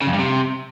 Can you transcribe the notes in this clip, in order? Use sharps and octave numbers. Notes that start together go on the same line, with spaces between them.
C#3
F2
G2
C3